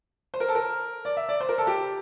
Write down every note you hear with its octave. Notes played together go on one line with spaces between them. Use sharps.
C5
A#4
A4
A#4
D5
E5
D5
C5
A#4
A4
G4